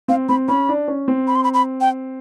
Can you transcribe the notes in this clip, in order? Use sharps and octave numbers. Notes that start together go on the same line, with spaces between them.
C4 F5
C4 B5
C#4 B5
D4
C#4
C4
B5
C6
B5
B5
G5